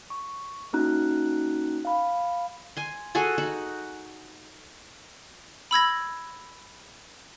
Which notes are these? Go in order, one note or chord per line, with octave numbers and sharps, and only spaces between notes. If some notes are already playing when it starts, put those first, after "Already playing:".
C#6
A#3 C#4 D#4 F#4 A#5 F#6
F5 B5
G#5 C6
F#4 G#4 A4 G#5
D#4 F#4
B5 E6 G#6 A#6